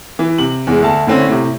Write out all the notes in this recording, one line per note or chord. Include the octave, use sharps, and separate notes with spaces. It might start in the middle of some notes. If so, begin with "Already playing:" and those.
E3
C3 F#7
E2 G#3
D2 A5
A2 D3 C4 C#4
A2 C3